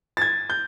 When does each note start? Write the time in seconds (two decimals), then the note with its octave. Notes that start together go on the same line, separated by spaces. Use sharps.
0.17 A6
0.22 G#6
0.50 G6